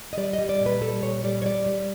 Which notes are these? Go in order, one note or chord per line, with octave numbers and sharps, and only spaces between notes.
D#5
G3 D5
D#5
G3
D5
A#2
B4
G3 A4
A#2 C#5
G3 D5
C#5
G3 D5
G3